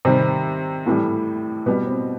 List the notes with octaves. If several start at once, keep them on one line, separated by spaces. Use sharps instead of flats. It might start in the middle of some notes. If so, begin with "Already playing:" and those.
C3 D#3 G3 C4
A2 E3 G3
B2 G3 B3
C4